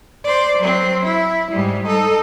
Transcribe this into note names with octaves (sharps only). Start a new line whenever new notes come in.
C5 D5
F#3 C4
E4
G#2 G3
D#4 A4